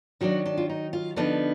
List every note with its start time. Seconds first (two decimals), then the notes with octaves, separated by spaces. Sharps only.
0.21 D#3 F#3 D4 F#4
0.46 D4
0.57 F4
0.69 D#4
0.93 F4
1.16 D3 F3 B3 D4 D#4